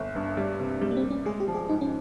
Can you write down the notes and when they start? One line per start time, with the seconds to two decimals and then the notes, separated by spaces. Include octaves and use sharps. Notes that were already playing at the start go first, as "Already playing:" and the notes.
Already playing: G1
0.15 G2
0.37 G3
0.59 C3
0.81 G3 G#3
0.91 A#3
0.97 C4
1.03 G3
1.10 C#4
1.26 G#3 G#4
1.40 G4
1.48 F3
1.55 G#4
1.69 G#2 D#4
1.81 C#4